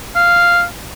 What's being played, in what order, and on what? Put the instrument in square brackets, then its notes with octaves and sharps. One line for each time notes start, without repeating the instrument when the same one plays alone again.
[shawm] F5